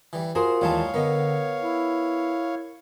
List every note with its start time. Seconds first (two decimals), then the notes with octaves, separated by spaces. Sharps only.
0.13 E3 G3
0.35 F4 F#4 G#4 A#4 C5
0.61 D#2 E3 G3 G#3 D#4 C#5 F5 A5
0.94 D3 B3 A#4 D#5
1.62 E4